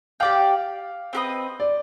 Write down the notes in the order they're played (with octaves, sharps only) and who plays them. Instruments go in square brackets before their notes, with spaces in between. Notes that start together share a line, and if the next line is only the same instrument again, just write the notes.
[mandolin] G4 D5 G5 [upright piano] F5
[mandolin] C4 G4 B4 D#5
[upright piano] D5